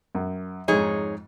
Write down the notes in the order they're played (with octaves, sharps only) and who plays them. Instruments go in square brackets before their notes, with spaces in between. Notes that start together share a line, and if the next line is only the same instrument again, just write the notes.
[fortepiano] F#2
[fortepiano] F2 G#2 [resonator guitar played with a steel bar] D#4 G#4 C#5